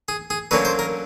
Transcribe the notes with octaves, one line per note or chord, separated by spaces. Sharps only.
G#4
G#4
D3 F#3 A#3 C#4 B4
C5
A#4